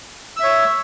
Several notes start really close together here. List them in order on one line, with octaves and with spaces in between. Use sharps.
E6 E5 C#5